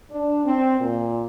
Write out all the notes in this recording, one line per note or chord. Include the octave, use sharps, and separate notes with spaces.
D4
C4
A#2